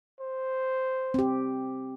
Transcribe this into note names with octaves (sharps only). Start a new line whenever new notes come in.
C5
C4 G4